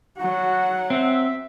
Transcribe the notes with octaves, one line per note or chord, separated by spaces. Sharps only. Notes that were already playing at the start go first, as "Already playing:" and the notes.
F#3 F#4 F#5
C4 E5